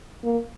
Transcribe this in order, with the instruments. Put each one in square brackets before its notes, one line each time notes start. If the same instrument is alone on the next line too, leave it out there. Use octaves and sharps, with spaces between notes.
[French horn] A#3